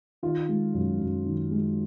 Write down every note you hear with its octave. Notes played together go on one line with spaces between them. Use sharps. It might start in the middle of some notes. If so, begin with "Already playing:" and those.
D#3 F4
G#3
F#2
F#2
D#3
G#3